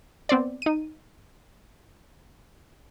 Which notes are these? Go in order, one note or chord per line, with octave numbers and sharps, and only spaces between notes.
B3 C4 C5 D5
D#4 D#7